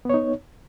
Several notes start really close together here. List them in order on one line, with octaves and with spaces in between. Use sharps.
B3 C#5 D#4